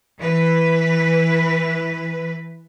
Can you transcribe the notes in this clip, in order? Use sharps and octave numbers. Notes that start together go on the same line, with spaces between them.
E3 B4